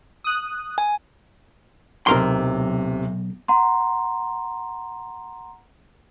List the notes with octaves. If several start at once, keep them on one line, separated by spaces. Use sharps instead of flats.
D#6 F#6
G#5
D1 B1 C3 A#4 C6
F#5 A#5 C6